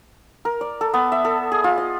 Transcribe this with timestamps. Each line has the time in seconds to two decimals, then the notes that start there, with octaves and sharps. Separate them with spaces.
0.45 A#4
0.61 D5
0.81 A4
0.94 B3
1.12 E5
1.25 A4
1.52 G#4
1.64 F4
1.78 D#5